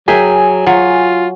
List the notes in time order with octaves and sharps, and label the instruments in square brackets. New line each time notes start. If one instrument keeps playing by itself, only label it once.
[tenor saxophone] F#3 [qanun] G#4 [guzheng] A#4 E5 G5 [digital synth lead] G#5
[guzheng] F#3 [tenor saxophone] F4